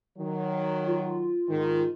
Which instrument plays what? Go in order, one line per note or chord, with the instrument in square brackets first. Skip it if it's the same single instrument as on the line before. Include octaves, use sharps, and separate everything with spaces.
[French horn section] D#3 F#3
[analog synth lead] F4
[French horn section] G#2 D#3